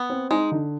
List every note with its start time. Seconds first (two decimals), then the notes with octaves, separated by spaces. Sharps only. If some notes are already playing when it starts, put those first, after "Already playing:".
Already playing: B3
0.10 C4
0.31 G#3 D#4
0.52 D3